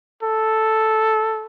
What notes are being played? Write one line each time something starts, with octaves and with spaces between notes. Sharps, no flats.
A4